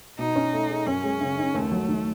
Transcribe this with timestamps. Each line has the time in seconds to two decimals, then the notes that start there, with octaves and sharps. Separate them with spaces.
0.19 B2 D#4
0.36 C#4
0.53 A3
0.70 G#4
0.86 F#2 C#4
1.04 G#3
1.21 C#3
1.38 D#4
1.54 D#2 A3
1.72 F#3
1.89 D#3